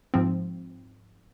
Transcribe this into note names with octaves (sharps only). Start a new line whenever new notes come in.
G#2 F3 C4